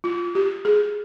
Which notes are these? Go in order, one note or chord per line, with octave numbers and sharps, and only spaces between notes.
F4
G4
G#4